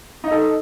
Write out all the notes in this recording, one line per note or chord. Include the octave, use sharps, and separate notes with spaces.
D#4 A4 D#5